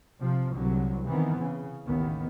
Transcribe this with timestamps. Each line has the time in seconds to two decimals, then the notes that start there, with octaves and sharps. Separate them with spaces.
0.19 C3 F3
0.54 C2 D3 F#3
1.07 D#3 E3 B3 C4
1.37 C#3
1.83 A1 D#2 D#3 B3